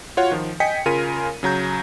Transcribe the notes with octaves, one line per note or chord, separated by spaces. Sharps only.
F4 F#4 C#5 F#5
D#3 F3
D#5 G5 G#5 B6 C#7
C#3 F4 A#4 G#5 D#7
C#3 F#3 A#5 G6